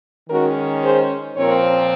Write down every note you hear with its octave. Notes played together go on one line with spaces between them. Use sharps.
D#3 G#3 C#4 F#4 A#4
G#4 C5
A#2 F3 C4 A#4 C#5